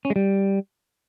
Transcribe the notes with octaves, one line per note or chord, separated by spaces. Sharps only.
C#4
G#3
G3